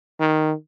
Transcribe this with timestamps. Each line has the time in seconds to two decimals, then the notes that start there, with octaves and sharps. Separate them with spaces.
0.20 D#3